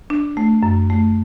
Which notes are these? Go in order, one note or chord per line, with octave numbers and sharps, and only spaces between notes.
D4
A3
F#2
A3